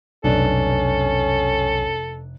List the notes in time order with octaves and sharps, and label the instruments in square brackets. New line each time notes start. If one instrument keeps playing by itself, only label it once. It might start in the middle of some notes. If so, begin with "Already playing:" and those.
[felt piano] F1 D4 [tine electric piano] B1 [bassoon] C#4 [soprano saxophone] A4